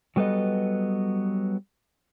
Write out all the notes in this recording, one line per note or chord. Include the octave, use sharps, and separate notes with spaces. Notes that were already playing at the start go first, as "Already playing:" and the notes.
F#3 G3 B3 A4 B4 D#5